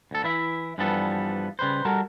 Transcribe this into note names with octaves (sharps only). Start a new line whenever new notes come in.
D2 A4
E3 E4 E5
G2 E3 F3 G3 B3 A4
C#3 G3 B4 C5
G3 F#4 A4 A#4